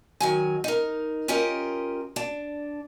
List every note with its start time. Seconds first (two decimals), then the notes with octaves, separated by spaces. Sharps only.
0.20 D#3 F#3 G#5
0.64 D#4 A#4
1.28 C#4 F4 G4 A#4 D#5
2.16 D4